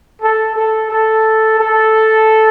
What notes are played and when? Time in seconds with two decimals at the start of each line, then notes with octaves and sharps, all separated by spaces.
0.20 A4
0.55 A4
0.90 A4
1.58 A4